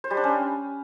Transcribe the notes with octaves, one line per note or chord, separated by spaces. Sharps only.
C5
G3
D4
C#4